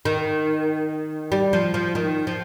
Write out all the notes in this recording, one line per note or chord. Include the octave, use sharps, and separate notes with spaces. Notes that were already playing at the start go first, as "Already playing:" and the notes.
D#3
G3
F3
F3
D#3
F3